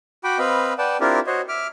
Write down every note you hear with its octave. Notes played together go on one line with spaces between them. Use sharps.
F#4 G5 B5 D6
C4 B4 D#5 F5 B5
B4 D5 F#5 G5 A5
C4 D4 E4 F4 G4 A#4
F#4 C5 C#5 D#5
E5 D6 F6